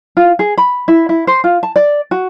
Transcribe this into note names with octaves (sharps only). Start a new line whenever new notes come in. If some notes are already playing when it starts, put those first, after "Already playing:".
F4
G#4
B5
E4
E4
C5
F4
A5
D5
F#4